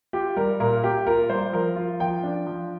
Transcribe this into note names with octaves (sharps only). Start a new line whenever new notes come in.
F4 G4
G3 A#4
A#2 A#4
A#3 G4
F4 A#4
G3 C5
F3 A#4
F4
F3 G5
D4
F3